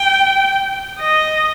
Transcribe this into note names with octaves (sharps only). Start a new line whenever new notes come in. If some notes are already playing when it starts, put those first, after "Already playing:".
Already playing: G5
D#5